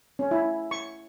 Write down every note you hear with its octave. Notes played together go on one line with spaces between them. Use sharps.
C#4
E4
C#6